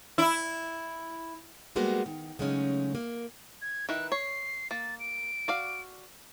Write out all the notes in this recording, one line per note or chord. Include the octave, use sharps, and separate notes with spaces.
E4
G3 G#3 A#3 B3 F#4 G#4
D#3
C#3 F#3 G#3 A3 C#4 D#4
A#3
G#6
D#3 E4 B4 F#6
C#5 C7
A#3 A6
D7
F#4 D5 F5